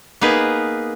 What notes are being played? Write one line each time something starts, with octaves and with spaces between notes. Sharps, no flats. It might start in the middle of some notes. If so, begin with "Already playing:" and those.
A#3 B3 D#4 G#4 B4